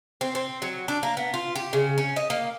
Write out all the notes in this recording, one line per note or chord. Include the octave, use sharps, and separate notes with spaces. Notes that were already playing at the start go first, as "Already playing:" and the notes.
C4
C4
F#3
D4
A#3
B3
F4
G4
C#3
C#4
D#5
A#3